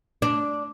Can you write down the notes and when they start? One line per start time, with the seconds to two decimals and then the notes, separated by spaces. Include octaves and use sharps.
0.22 D4